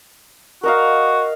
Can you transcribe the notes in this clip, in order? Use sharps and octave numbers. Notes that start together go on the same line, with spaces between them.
F#4 A#4 D#5 F5